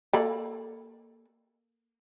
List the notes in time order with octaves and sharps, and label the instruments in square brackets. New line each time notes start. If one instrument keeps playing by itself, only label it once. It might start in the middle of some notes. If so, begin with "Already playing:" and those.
[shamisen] A#3 A4 B5